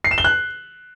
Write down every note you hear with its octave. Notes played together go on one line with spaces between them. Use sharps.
C7
E7
G7
F#6